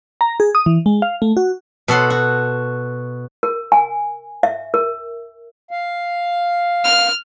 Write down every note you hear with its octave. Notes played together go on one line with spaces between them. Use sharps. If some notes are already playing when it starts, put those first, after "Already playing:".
A#5
G#4
D#6
E3
G#3
F5
A3
F#4
B2 A4 F#5 C6
F#4
A#4
G#5
E5
A#4
F5
F6